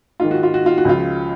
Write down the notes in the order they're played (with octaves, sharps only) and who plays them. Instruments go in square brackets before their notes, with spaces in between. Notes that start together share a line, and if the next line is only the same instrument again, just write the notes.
[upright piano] G#2 D#3 F4
F#4
F4
F#4
F4
F#4
C#2 C#3 F3 F4